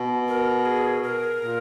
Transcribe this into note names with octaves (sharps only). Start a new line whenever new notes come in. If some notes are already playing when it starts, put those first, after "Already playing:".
Already playing: B2
A#4
G#4
A#4
A#2